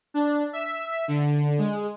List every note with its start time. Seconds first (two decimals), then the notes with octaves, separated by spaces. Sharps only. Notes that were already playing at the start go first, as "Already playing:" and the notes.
0.14 D4
0.53 E5
1.08 D3
1.58 G#3